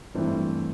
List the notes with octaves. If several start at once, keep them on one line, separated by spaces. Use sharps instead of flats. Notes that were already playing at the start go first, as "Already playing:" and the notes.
G2 E3 A3 C4